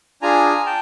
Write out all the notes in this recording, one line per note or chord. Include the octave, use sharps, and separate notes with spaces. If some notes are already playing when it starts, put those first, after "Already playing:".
D4 F4 G#4 G#5 A#5
G5 A5